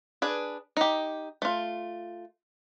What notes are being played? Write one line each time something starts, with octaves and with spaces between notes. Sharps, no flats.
D4 G#4 B4
D#4 G4
A3 F4